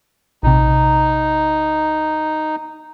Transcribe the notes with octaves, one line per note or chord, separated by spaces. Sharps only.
A#1 C3 D#4